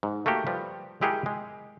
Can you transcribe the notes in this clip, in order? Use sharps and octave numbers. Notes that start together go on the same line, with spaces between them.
G#2
A3 A#3 F#4 G4
F3 G3 B4
G#3 E4 G4 G#4 A#4 F#5
G#3